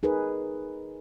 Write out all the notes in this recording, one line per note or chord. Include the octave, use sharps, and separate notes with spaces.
D#4 G#4 A#4 B4